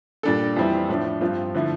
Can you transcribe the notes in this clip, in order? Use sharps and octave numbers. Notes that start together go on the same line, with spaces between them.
A#2 G3 D4 A4
F2 E3 G3 C4 E4
A2 F3 A3 D4
G2 F3 C4 F4
D3 F3 A3 E4